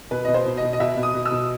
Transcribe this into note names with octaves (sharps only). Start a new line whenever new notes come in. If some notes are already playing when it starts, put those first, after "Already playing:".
B2 B4
B2 D#5
C5
B2
D#5
B2
D#5
B2 E5
B2
D#6
B2
E6
B2